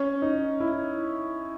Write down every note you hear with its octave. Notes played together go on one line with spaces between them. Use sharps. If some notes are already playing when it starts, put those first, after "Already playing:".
Already playing: C#4
D#4
E4